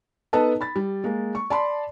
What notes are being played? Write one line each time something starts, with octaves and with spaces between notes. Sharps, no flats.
B3 D#4 A4 B4 D#5 A5
B5 A6
G3
G#3 A#3
C#6
D5 A5 B5 C6